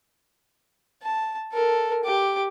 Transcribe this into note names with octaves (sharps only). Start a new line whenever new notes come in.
A5
A4 A#4
G4 D6